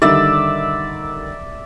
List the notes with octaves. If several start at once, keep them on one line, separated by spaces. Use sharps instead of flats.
D3 D#3 G3 D5 E5 E6